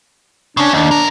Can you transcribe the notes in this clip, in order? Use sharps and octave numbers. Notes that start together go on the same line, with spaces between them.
C#3 C#4 D4
D#2 D4
B1 A#4